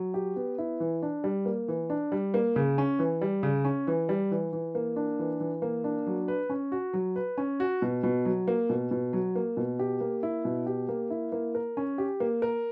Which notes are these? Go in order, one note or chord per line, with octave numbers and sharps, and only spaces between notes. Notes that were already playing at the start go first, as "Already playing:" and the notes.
Already playing: F#3
G4
B3
E4
E3
D4
G3
A#3
E3
D4
G3
A#3
C#3
C#4
E3
G3
C#3
C#4
E3
G3
E3
E3
A#3
D4
E3
E3
A#3
D4
F#3
B4
C#4
F#4
F#3
B4
C#4
F#4
B2
B2
F#3
A#3
B2
B2
F#3
A#3
B2
G4
A#3
E4
B2
G4
A#3
E4
A#3
A#4
C#4
G4
A#3
A#4